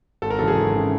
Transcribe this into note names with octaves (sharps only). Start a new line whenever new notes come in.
G#1 A4
A#4
F#2 C#3 E3 A4
G#4
G#1
C#3 E3